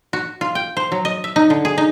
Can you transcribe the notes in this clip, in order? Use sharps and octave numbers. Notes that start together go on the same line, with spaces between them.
F#4
F4
G5
C5
F#3
D#5
E5
D#4
D3
G#4
D#4